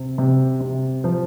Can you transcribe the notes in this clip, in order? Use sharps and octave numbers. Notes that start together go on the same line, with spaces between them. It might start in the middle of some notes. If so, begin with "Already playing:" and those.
Already playing: C3 C4
C3
C3
F3